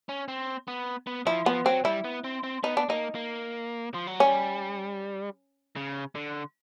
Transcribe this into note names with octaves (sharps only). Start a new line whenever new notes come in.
C#4
C4
B3
B3
F3 E4
F3 B3
F#3 C4
G3 E4
B3
C4
C4
B3 D#4
D4
A#3 D#4
A#3
F3
F#3
G3 C#4
C#3
D3